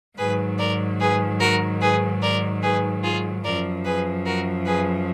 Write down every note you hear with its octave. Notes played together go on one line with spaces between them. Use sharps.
G#2 D#3 F#3 G#4 B4
A#4 D5
G#4 B4
F#4 A#4
G#4 B4
A#4 D5
G#4 B4
F4 G#4
F#2 F3 A#4 D5
G#4 B4
F#4 A#4
G#4 B4